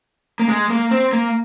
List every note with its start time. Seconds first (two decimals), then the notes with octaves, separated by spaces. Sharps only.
0.39 A#3
0.49 G#3
0.70 A#3
0.91 C4
1.13 A#3